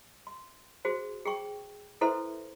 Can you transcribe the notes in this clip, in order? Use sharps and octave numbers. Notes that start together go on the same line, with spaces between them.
C6
F#4 G#4 C5
G#4 G5 C#6
E4 A4 B4 C5 E5 C6